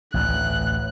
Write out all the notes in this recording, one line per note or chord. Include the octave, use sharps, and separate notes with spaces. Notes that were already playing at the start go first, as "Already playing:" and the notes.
A1 D2 F#6